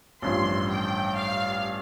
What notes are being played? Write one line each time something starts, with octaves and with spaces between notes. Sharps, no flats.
A1 G2 F3 C6
G5
F5